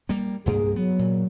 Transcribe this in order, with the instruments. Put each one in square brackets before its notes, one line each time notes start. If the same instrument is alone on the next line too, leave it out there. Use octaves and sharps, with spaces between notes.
[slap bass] G3 A#3
[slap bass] C2 G2 A#3 [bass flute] G#4
[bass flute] F#3 [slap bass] B3
[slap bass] A#2